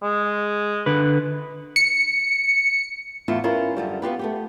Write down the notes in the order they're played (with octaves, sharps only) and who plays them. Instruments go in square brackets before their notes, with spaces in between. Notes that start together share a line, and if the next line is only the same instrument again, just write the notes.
[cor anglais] G#3
[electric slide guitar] D3 B4
[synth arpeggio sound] C#7
[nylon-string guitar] E2 A2 E4 F4 E5
C#4 E4 F4 A#4 B4
F#2 D3 G3
B3 F4 G4 B4
A3 B3 G4